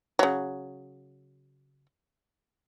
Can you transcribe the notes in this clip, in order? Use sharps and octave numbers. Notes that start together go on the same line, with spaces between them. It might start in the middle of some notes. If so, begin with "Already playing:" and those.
C#3 F#3